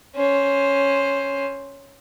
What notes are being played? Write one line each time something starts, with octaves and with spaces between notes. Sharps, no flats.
C#4 C5